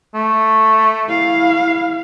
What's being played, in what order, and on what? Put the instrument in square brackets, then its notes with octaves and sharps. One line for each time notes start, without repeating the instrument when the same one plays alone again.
[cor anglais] A3
[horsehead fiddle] E4 F5